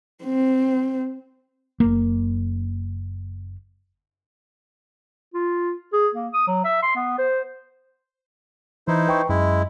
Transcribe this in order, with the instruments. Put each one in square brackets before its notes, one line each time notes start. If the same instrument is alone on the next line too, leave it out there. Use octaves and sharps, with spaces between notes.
[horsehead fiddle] C4
[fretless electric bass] F#1 A#3
[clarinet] F4
G#4
A#3
D#6
F#3
E5
C6
B3
C5
[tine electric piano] E3 [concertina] D#4 E4 C5
[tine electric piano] B4 G5 C#6
[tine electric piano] F#2 [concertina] G#3 E4